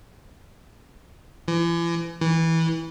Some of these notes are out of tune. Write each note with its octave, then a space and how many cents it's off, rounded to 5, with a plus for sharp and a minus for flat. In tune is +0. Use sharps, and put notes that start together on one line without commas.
E3 +40
E3 -15